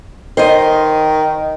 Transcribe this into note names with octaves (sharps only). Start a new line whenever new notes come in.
D#3 C5 D#5